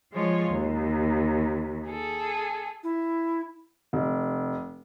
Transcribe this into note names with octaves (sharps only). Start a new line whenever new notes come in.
F3 G#3 F4 C#5
D#2
G#4 A4
E4
F1